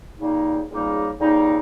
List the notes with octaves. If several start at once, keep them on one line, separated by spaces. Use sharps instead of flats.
C#2 C#3 G3 A#3 D#4
C#2 C#3 G3 A#3 D#4
C#2 C#3 G3 A#3 D#4